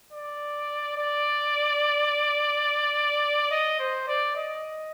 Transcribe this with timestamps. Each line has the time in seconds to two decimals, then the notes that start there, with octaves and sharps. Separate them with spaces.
0.13 D5
0.97 D5
3.51 D#5
3.80 C5
4.08 D5
4.36 D#5